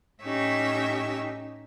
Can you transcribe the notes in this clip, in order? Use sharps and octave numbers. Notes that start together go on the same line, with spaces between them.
A2 C#4 D#4 G4 E5 C#6